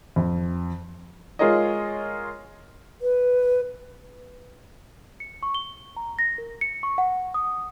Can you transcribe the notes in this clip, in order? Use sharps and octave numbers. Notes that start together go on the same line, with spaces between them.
F2
G#3 F4 G#4 A#4 C#5 D#5
B4
C#7
C#6
G7
A#5
A#6
A#4
C#7
C#6
F#5
D#6